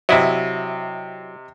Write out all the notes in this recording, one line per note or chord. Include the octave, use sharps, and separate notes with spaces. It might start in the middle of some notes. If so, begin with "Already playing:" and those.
C3 F#3 E4 D#5